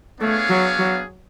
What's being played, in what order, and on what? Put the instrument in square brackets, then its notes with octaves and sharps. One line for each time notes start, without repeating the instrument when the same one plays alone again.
[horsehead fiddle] A3 [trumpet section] B3 D4 G#4 C#5 F5
[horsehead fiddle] F#3
F#3